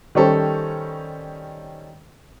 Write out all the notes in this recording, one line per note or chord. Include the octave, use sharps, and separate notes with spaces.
D#3 G3 C#4 G4 A4 C5